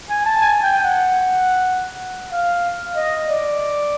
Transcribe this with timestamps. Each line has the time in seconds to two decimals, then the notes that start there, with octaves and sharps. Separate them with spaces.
0.10 G#5
0.25 A5
0.42 G#5
0.63 G5
0.83 F#5
2.31 F5
2.95 D#5
3.26 D5